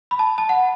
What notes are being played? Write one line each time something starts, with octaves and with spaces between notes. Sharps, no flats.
B5
A5
A5
F#5